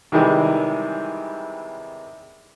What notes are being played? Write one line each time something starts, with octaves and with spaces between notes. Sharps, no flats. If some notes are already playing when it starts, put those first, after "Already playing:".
C3 D#3 E3 G3 G#3